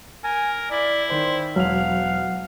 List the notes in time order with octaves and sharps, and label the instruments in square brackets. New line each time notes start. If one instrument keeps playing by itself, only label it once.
[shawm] A#4 [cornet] G#5
[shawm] E4 [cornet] D5
[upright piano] D#3 D5 [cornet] C5
[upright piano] E1 F7 [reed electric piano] F#3 [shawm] F5 [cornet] F#5